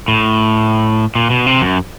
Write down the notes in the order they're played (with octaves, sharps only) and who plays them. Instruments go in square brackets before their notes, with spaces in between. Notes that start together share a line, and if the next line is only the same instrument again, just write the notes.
[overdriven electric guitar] A2
A#2
B2
C3
F#2